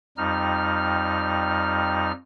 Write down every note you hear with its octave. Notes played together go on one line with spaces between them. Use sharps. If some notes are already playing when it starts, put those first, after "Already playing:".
F2 G3 D#4 F6